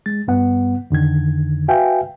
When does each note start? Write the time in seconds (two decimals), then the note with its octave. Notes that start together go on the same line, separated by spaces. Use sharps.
0.06 G#3 A6
0.28 G2 G3 B3 F#5
0.90 F2 D3 D#3 G#6
1.68 F#4 B4 E5 F5 G5 G#5